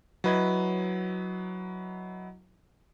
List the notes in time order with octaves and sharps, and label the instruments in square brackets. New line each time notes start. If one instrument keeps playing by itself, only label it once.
[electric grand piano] F#3 E4 B4 D#5 G#6